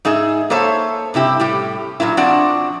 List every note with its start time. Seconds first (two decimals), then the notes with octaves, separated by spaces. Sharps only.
0.05 G#2 D#4 G#4 E5
0.50 A#3 A4 C5 C#5 E5 A5
1.14 G2 C3 E4 G4
1.40 A2 G3 G4
2.00 A#2 F#3 A#3 E4
2.17 F3 C4 D4 F#4 D5 F#5